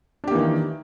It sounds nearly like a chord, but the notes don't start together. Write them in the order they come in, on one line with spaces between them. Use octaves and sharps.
D4 G4 A#3 E3 D#3